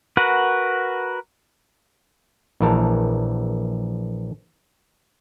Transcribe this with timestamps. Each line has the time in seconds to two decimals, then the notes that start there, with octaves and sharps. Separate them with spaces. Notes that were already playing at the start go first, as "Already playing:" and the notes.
0.17 F#4 A#4 B4 F#5
2.60 A#1 E3 A#4 A5